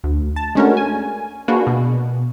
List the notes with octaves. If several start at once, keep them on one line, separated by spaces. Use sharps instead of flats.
D2
A5
G#3 A3 C#4 D4 F#4 A#4
G#5
A#3 D4 F4 F#4 G#4 B4
B2